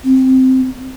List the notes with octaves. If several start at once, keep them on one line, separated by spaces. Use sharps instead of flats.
C4